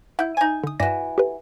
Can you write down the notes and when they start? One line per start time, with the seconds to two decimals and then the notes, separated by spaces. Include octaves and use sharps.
0.19 E4 F#5 G6
0.37 D#4 G#5
0.64 D3 D#6
0.80 G2 E3 F#4 D5 A#6
1.18 G4 A4 B4